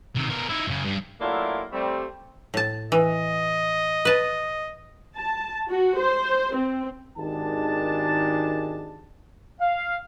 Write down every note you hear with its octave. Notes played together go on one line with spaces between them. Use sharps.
C3 D#3
B2 A#4
D#4 E4
F#2 C#3
G2
F#3 A3 A#3 D4 E4 F4
G3 A3 C4
A2 A5
E3 D#5
B4 A5
A5
F#4
C5
C4
G#1 D#3 G#3 D4 G4 A5
F5